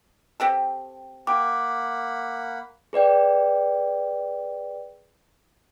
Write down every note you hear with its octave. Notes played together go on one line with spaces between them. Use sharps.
C4 G4 A4
A#3 G4 F#5 B5 D6
G#4 B4 D5 G5